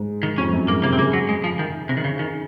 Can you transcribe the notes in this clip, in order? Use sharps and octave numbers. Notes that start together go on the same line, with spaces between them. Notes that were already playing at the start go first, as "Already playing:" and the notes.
Already playing: G#2
D#3
F2 C#4
F#2
G#2 A#3
C3 A#3
C4
C#3 A#3
F#3
G#3
F3
D#3
C3
D#3
C#3
D#3